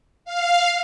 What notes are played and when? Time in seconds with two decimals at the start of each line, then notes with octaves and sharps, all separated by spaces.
0.25 F5